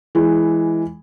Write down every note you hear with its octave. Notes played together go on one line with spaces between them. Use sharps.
E3 G#3